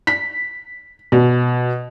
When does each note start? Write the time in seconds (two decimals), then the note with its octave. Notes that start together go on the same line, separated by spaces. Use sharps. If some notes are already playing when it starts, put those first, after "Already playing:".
0.07 B6
1.12 B2